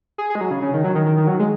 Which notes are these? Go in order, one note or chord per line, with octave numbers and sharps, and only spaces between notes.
G#4
G#4
G#3
F#3
C#3
C#3
D#3
F#3
D#3
D#3
D#3
F#3
G#3